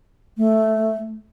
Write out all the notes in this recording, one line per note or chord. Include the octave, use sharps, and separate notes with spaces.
A3